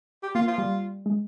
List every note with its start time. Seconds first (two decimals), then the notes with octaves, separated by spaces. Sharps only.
0.23 G4
0.35 A#3 F4
0.47 F4
0.58 G3
1.06 G#3